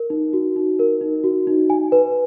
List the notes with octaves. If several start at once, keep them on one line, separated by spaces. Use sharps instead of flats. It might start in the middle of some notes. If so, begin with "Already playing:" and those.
Already playing: A#4
D#4
F#4
D#4
A#4
D#4
F#4
D#4
G#5
B4